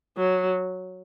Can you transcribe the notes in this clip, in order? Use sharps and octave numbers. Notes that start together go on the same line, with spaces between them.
F#3